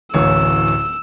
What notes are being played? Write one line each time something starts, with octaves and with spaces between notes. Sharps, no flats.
D1 A1 C#5 E6